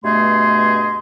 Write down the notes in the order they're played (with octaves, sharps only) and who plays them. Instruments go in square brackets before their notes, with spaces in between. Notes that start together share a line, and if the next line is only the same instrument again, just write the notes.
[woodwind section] G2 B2 A3 G#4 D#5 C6